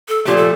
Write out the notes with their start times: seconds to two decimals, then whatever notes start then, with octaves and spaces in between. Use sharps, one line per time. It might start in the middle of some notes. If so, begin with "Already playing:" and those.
0.08 A4
0.25 A#2 F3 A3 G4
0.37 A4